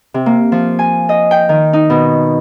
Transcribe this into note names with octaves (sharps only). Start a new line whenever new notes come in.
C3
A#3
F3
G#5
D#5
G5
D#3
D#4
B2